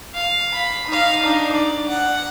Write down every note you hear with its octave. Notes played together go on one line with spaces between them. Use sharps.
F5
B5
D#4 F5
D4 D#4
D5
F#5